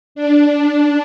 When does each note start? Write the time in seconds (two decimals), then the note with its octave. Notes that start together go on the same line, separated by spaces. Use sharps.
0.15 D4